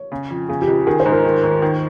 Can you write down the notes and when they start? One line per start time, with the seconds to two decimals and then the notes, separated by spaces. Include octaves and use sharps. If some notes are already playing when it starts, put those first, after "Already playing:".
Already playing: C#5
0.12 C#3
0.30 F2
0.49 C#3 G#4
0.62 G4
0.68 C#2
0.87 D#3 G#4
1.00 C5
1.06 G#2
1.12 A#4
1.25 D#3
1.43 D#2
1.62 D#3